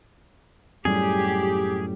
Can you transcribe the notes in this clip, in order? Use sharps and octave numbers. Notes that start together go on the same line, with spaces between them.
F#2 A2 G3 G4 G#4